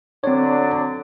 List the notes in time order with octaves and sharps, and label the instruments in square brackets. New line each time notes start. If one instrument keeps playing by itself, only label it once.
[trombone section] D3 F#3 D4 [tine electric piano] C4 C#5